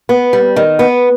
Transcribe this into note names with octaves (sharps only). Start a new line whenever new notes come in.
B3
G3
D#3
B3